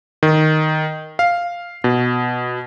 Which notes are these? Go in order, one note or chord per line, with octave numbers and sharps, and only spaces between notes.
D#3
F5
B2